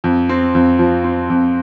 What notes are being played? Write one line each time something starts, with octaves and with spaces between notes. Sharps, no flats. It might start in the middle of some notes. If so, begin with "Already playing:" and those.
F2
C4
F2
F3
C4
F2